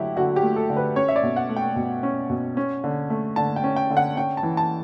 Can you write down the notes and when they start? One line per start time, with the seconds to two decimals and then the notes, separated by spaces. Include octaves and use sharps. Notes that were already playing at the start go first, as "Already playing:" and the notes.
Already playing: D3 F#3 A3 E4 F#4 G4
0.16 D3 F#4
0.36 G4
0.43 A3
0.56 A4
0.70 D3
0.77 B4
0.96 C#4 C#5
1.08 E5
1.16 D5
1.23 B2
1.36 F#5
1.49 A3
1.57 G5
1.76 B2
2.03 C#4
2.30 B2
2.57 C#4
2.84 D3
3.10 A3
3.36 D3 A5
3.56 G5
3.64 C#4
3.76 G5
3.90 D3
3.97 F#5
4.16 C#4 G5
4.37 A5
4.43 E3
4.57 A5